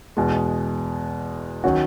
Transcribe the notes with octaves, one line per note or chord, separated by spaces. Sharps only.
E2 B2 G#3
D#3 F#3 C#4 F#4